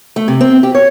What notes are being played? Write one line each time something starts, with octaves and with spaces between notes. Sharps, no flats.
A3
C3
C4
G4
C#5